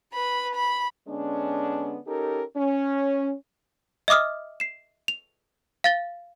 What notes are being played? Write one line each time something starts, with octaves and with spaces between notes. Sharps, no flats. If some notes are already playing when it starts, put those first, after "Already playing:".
B4 B5
B5
D3 G#3 B3 C#4 D4
C#4 D#4 G4 A4 A#4
C#4
D#5 E5 D6 D#6 F6
C7 E7
F7
F5 A6 G7